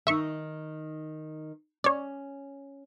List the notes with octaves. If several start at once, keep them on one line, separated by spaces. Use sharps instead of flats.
D#3 D#4 E5 C#6
C#4 C#5 D5